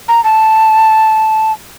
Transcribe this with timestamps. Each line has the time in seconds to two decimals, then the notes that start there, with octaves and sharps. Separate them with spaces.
0.08 A#5
0.24 A5